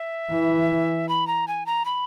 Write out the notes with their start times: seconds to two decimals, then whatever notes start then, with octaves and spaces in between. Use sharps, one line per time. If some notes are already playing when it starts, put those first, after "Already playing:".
Already playing: E5
0.30 E3
1.09 B5
1.27 A#5
1.48 G#5
1.66 A#5
1.85 B5